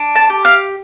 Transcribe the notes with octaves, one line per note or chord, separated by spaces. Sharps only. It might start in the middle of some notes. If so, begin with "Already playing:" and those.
Already playing: D4
A5
G4
F5